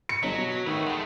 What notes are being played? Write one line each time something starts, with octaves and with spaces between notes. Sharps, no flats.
C#7
G1 F#3 D#5 A#5 B6
B2
C#6
D#3 A3 B4
G#3 A3 F#5 G5